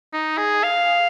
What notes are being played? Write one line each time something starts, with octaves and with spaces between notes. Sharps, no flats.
D#4
G#4
F5